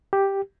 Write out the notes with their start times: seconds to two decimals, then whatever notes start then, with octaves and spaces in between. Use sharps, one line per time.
0.13 G4